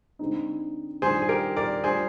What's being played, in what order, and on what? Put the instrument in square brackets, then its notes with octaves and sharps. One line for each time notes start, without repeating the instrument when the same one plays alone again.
[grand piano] D3 G#3 C4 D#4
[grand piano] D#3 G3 D4 F4 [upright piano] G#4 C5
[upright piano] G#4
G4 A#4
A#4 D5
[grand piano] G3 D4 F4 [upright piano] G#4 C5